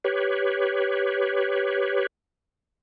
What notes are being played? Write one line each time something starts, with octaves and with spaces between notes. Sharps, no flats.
G4 B4 C#5